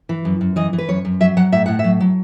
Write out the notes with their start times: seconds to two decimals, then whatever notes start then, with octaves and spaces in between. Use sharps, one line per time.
0.09 E3
0.25 F#2
0.41 F#2
0.56 E3 D#5
0.73 E3
0.78 B4
0.89 F#2 C#5
1.05 F#2
1.20 F#3 E5
1.37 F#3 F#5
1.52 A2 E5
1.66 A2 F#5
1.79 E5
1.84 F#3
2.00 F#3